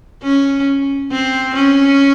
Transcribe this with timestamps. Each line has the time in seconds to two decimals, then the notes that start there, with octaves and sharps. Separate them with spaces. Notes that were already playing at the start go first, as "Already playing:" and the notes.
0.23 C#4
1.11 C4
1.55 C#4